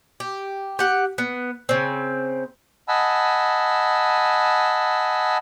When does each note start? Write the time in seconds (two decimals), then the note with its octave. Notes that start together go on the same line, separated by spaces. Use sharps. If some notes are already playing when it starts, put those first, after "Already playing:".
0.20 G4
0.79 G4 F#5
1.18 B3
1.69 C#3 C4
2.88 D#5 F#5 G#5 A5 B5 E6